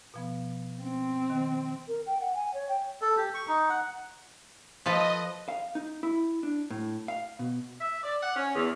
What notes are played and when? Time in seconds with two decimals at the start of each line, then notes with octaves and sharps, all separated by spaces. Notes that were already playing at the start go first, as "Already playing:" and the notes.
0.14 B2 F3 B3
0.82 C4
1.30 D#3
1.88 A#4
2.06 G5
2.21 F#5
2.35 G#5
2.54 C#5
2.69 G5
3.02 A4
3.17 G4
3.34 C#6
3.48 D#4
3.70 F#5
4.86 F3 A4 B4 D#5
5.48 F5
5.75 D#4
6.03 E4
6.43 D4
6.71 A2
7.08 F5
7.39 B2
7.81 E5
8.03 D5
8.23 F#5
8.36 C#4
8.55 E2